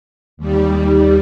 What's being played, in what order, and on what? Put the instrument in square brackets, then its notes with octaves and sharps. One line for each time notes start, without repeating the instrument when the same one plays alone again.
[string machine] D#2 G3